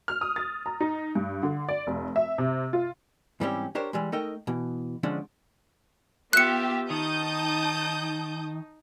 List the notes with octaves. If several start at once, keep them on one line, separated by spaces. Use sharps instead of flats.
F6
D#6
A6
A#5
D#4
G2
D3
D5
F1
E5
C3
F4
G#2 E3 G3 C4 C#4 G4
D4 G4 A#4 C5 C#5
E3 G3 G#3
A3 D#4 A4 A#4 D#5 G5
B2 E3
D3 F3 G#3 C#4 D4
B3 F4 G4 E5 F#6 C#7
D#3 D#4 A5 D#6 G6